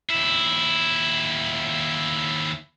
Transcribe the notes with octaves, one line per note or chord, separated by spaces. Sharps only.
D#2 E4